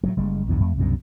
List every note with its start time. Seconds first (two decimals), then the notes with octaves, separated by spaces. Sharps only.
0.04 A2 F#3 G3
0.17 F#1 G3 G#3
0.48 B1 E2 G2 D3
0.60 F2 A3
0.78 C2 F#2 B2 D3